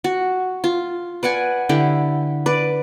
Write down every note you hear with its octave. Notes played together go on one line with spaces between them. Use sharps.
F#4
F4
B4 D5 F#5 G#5
D3 E4 G4
B4 D5